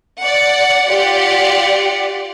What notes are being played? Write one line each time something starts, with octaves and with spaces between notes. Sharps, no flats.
D5 F#5
F4 G4 D5 F#5